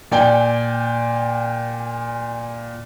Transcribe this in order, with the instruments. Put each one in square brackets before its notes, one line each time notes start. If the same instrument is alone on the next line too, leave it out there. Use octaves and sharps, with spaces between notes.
[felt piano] A#2 D5 G5 G#5